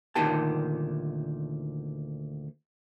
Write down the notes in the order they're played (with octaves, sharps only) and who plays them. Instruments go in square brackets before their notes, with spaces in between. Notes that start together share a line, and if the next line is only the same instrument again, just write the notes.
[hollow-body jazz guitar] D2 A#2 D#3 G4 A5